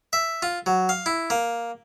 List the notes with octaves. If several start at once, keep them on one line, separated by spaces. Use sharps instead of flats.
E5
F4
F#3
F5
E4
A#3